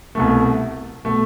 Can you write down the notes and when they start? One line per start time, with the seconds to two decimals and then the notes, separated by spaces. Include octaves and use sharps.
0.15 C2 B2 A3
1.05 B2 A3